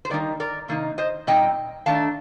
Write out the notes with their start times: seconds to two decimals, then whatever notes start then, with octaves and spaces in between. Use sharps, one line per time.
0.05 C5
0.10 D#3 G3 A#3 D#4 A#4 D5
0.40 A#4 D5
0.68 C3 D#3 A#3 D#4
0.98 C5 D#5
1.27 A#2 G3 C4 D#4 D#5 G5
1.86 D#3 A3 D4 F5 A5